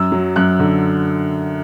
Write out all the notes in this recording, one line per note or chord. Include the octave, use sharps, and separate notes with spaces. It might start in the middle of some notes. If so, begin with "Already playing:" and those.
Already playing: F#2 E6
F#3
F#2 F#6
D3